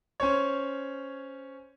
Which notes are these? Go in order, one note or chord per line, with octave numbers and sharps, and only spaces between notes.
C#4 C5 C#5